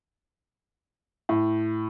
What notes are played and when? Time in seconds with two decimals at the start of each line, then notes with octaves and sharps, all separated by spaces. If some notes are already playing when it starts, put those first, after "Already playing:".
1.29 A2